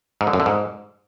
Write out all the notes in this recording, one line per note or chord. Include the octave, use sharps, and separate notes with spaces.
G#2
D3
F#2
D3
G#2